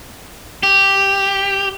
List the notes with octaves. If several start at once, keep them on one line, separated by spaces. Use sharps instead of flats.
G4